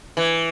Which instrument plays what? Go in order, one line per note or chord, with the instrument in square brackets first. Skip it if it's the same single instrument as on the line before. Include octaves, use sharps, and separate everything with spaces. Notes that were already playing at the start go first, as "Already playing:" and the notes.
[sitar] E3